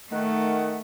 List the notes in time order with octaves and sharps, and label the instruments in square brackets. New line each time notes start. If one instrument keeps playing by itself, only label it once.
[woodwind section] D#3 F#5 [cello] A3